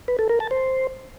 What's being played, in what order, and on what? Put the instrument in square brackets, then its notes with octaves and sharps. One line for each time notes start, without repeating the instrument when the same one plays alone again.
[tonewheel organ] B4
A4
A#4
A5
C5